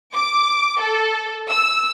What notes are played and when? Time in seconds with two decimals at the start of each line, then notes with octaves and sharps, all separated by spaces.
0.15 D6
0.81 A4
1.50 E6